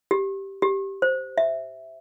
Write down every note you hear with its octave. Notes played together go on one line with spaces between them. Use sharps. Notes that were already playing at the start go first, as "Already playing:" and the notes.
G4
G4
C5
E5